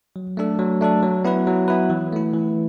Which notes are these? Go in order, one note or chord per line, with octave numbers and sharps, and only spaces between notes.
F#3
A3 D4 A4
F#3
A3 D4 A4
F#3
B3 E4 B4
F#3
B3 E4 B4
E3
A3 E4
E3